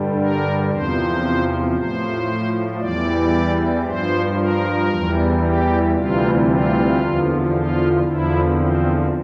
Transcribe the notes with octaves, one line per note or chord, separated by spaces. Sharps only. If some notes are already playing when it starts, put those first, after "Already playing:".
Already playing: G2 D3 G3
A#4
E2 C3 F3 C5
A2 F3 C5
E2 E3 G3 D5
G2 F3 C5
A#4
E2 E3 G3
G4
D2 C3 E3 G3 F4
F4
E2 D3 F3
F4
E2 D3 F3 E4
C4